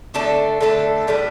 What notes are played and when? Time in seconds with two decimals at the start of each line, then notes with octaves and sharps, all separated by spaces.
0.14 D3 A3 D4 A4
0.61 D3 A3 D4 A4
1.07 A2 G3 B3 D4